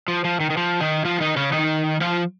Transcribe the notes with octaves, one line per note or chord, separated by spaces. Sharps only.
F3
F3
D#3
D#3
F3
D#3 D#4
F3 F4
D#3 D#4
C#3 C#4
D#3 D#4
F3 F4